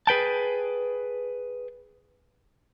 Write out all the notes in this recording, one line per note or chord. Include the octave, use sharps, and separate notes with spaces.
G#4 B4 G5 A5